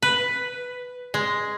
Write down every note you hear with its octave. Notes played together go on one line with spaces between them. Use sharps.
B4
G#3